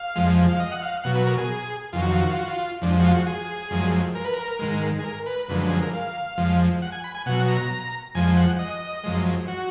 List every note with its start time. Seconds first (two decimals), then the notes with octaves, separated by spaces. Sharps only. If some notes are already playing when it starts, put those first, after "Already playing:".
Already playing: F5
0.16 F2 F3 G#3
0.49 F5
0.60 D#5
0.72 F#5
0.82 F5
1.04 B2 F#3 F#5
1.15 B4
1.27 A#4
1.38 G#4
1.93 F2 D#3 F#3 F4
2.02 F#4
2.11 F4
2.21 F#4
2.30 F4
2.39 F#4
2.48 F4
2.82 F2 F3 G#3 D4
3.00 F#4
3.04 F4
3.15 F#4
3.27 G#4
3.71 F#2 F3 G#3
4.15 A#4
4.25 B4
4.34 A#4
4.59 G#2 D#3 G#3
4.99 G#4
5.04 A#4
5.26 B4
5.49 F#2 D3 F3 G#3 B4
5.59 B4
5.70 G#4
5.82 A#4
5.93 F5
6.38 F2 F3 G#3
6.82 F#5
6.92 G#5
7.04 B5
7.15 G#5
7.26 B2 F#3 F#5
7.48 A#5
8.15 F2 F3 G#3 G#5
8.37 F#5
8.59 D#5
9.04 F#2 F3 G#3
9.48 F#4